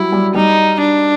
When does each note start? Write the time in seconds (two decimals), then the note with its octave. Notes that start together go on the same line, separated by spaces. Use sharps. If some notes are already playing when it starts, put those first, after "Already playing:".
Already playing: F#3 G3 E4
0.12 G3
0.34 G3 D#4
0.81 D4